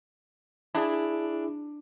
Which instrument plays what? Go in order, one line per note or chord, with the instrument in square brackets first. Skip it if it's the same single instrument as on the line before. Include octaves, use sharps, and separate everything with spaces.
[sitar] D4 [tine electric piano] E4 G#4